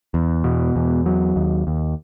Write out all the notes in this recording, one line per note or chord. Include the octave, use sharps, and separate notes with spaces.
E2
B2
E2
F#3
D#2
D#2